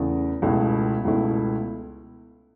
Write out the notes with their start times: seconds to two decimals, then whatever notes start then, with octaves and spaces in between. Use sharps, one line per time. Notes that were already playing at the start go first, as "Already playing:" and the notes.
Already playing: E2 C#3 A3
0.42 C#2 B2 A3 E4
1.05 C#2 B2 A3 E4